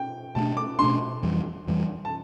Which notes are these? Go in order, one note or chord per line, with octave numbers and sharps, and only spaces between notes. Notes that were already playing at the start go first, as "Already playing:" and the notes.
Already playing: G5
B2 A3 D4 A5
D6
B2 A3 D4 C6
F2 E3 G3
F2 E3 G3
A5